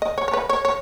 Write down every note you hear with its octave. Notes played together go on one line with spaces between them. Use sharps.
D#5
C#5
C#5
B4
C#5
C#5